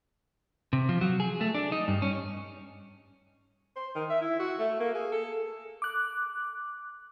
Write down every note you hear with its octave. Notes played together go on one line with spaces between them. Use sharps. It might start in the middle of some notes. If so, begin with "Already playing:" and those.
C3
F3
F#3
G#4
A3
D4
D#4
G2
C#4
C5
D#3
E5
E4
F#4
A3
A#3
G#4
A4
D6 F#6